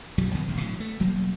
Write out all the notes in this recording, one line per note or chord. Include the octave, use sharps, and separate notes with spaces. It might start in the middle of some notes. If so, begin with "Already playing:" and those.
B1 F#2 F3 G3
F#2 B2 D#3 F#3
E1 A1 F2
A2 D3 F#3
A3
E1 F#3 G3 A#3